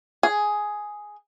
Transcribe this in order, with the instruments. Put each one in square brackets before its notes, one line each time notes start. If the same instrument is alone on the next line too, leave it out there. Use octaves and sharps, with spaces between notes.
[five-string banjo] G#4